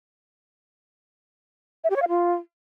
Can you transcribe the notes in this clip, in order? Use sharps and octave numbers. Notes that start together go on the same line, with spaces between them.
E5
G4
C#5
F5
F4